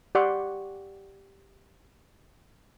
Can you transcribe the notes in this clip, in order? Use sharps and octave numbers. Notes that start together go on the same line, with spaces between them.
G4 D5 F#5 C6 C#6